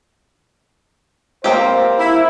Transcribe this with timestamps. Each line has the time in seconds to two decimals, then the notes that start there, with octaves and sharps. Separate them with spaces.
1.44 A#3 C4 G4 C5
1.98 E4